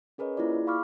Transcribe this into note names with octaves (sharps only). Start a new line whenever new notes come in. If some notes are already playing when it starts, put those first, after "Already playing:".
C#4 G#4 A#4 B4 C#5 D#5
A#3 E4 F4 D5
G#4
F5 B5 C#6 D6 F6